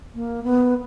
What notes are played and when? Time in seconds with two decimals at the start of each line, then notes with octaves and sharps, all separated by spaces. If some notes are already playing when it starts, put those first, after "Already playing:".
0.15 A#3
0.44 B3